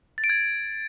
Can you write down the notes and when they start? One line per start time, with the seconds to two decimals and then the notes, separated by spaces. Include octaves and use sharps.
0.18 A6
0.24 D7
0.29 G#6